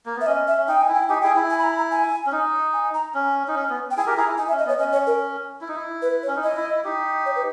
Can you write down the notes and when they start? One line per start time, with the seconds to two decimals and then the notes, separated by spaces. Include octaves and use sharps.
0.06 A#3
0.16 B3
0.21 E5
0.26 C#4 D#5
0.47 E5
0.58 C#4
0.68 D#4 G5
0.81 G#5
0.88 E4
0.94 G5
1.08 D#4 G4 G#5
1.21 E4 G#4 G5
1.36 E4
1.50 G#5
1.59 B5
1.64 A#5
1.78 A#5
1.91 G#5
2.26 C#4
2.32 D#4
2.73 G#5
2.94 A#5
3.14 C#4
3.48 D#4
3.55 C#4
3.70 B3
3.91 G5
3.97 E4 G#4 G#5
4.07 G4 A#4
4.17 E4 G#4 A#5
4.28 E4
4.38 D#4 G#5
4.48 E5
4.51 C#4
4.59 D#5
4.65 B3 C#5
4.79 C#4 D#5
4.93 C#5
5.07 A#4
5.61 E4
5.69 D#4
5.76 E4
6.02 B4
6.23 C#5
6.28 C#4
6.36 D#4
6.43 E4 D#5
6.57 E4
6.71 E4
6.84 D#4 G4
7.26 C#5
7.36 B4